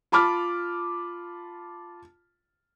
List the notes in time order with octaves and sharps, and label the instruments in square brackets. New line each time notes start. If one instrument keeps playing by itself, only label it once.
[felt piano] F4 A5 B5 D6 F6